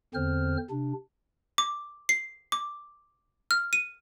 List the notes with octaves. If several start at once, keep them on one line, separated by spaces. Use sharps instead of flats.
E2 D3 C4 C5 F6
C3 D4
D6
C7
D6
F6
D#7